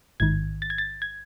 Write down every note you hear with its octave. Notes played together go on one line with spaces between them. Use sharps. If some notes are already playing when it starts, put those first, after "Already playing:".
A1 G#2 D#3 G#6
A6
G#6
A6
G#6